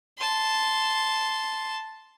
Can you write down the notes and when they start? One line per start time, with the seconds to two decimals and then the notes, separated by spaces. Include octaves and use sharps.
0.18 A5 C6